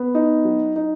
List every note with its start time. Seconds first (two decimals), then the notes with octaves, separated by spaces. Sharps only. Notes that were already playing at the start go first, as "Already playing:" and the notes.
Already playing: B3
0.15 D#4
0.45 F#3
0.76 D#4